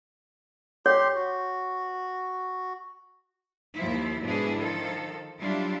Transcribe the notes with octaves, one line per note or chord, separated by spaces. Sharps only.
G4 C#5 C6
F#4
D#2 F3 E4
G#2 B2 G#3 D4 E4 G#4
D#3 F3 A4
F#3 G3 D4 E4 F4